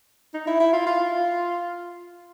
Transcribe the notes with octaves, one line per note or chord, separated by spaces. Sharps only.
D#4
E4
E4
F4
F4